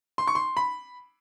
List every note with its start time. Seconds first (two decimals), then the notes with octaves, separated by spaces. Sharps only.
0.18 C6
0.27 C#6
0.35 C6
0.57 B5